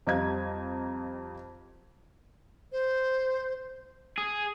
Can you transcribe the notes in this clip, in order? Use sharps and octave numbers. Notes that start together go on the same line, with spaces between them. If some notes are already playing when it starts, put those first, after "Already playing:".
F2 G3 D#5 F5 A#5 G#6
C5
G#4